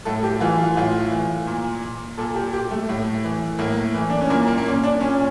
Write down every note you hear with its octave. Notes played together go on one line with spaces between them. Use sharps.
A2 A4
G4
E3 F4
F4
A2 F4
E3
A#2
A#2 A4
G4
G4
A3
A2
E3
A2 A#3
E3
D4
C#4
A#2 A#3
A#3
A#3
C#4
D4
A#2 C#4